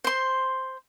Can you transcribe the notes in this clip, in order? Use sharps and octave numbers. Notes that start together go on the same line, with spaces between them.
C5 C6